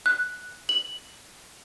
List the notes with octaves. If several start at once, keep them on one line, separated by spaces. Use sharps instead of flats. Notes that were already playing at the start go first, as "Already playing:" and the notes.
F#6
F#7